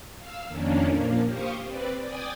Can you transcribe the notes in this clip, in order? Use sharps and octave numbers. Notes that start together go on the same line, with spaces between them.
F5 E6
F2 D#3 A#3 C#4 D4
A#2 F3 A#3
G4 C5 F5 C#6 D#6
C4 B4 D5
D5 G5 G#5 D#6 A6